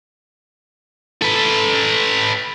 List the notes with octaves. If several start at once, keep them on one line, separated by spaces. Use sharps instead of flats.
A4 B4